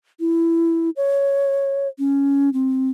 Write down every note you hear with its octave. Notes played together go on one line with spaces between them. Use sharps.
E4
C#5
C#4
C4